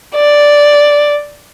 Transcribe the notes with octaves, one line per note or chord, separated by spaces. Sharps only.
D5